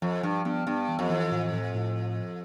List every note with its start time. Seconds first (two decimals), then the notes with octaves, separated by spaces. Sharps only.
0.02 F2 F3
0.23 G2 F3
0.45 G2 B3
0.67 G2 B3
0.89 E3
0.99 F2
1.10 E3
1.31 A2
1.53 A2
1.74 A2